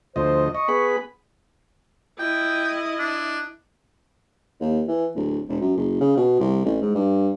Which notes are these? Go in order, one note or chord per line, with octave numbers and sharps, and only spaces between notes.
D2 F3 C5 D#5
D#5 C#6
B3 G#4 B5
E4 D#5 G5
D4
D#2
E3
D1
E1
F#2
F#1
C#3
B2
C2
A1
G#2
G2